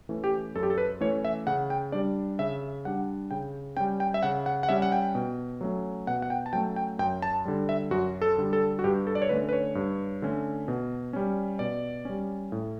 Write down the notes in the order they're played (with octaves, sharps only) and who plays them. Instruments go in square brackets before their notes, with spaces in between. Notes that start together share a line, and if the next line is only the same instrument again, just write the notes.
[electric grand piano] E3 A3 C#4
G4
F#2 A4
G4
A4
B4
E3 A3 C#4 C#5
E5
C#3 F#5
G5
G3 D4 D5
C#3 E5
G3 D4 F#5
C#3 G5
G3 C#4 G5
G5
E5
C#3 F#5
F#5
F#5
G3 C#4 E5
F#5
G5
B2
F#3 A3 C#4
B2 F#5
F#5
G5
A5
F#3 A3 C#4 G5
G5
F#2 G5
A5
D3 G3
E5
F#2 F#4
A4
D3 G3
A4
F#4
G2 G4
A4
D5
C#5
D3 A3 C#4 B4
B4
C#5
G2
D3 A3 C#4
B2
G3 C#4
B2 D5
G3 C#4
A2